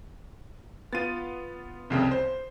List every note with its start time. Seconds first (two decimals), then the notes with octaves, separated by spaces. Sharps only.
0.93 B3 F4 A6 D#7
1.90 C2 F2 C#3
2.11 C5